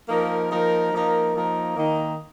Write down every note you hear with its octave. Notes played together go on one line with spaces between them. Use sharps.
F3 A#3 D#4 A#4
F3 A#3 D#4 A#4
F3 A#3 D#4 A#4
F3 A#3 D#4 A#4
D#3 A#3 D#4